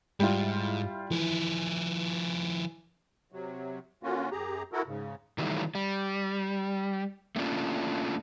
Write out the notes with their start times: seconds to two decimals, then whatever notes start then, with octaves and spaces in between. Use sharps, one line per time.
0.20 G#2 G3 E4 F4
1.11 E3 F3 E4
3.32 C3 F#3
4.03 D3 A#3 C#4 F4 F#4
4.32 F#2 G4 G#4 A#5
4.73 E4 F#4 A4 A#4
4.87 G#2 C#3
5.38 D#3 E3 F#3 G3 A3
5.75 G3
7.36 A3 A#3 C#4 D4 F4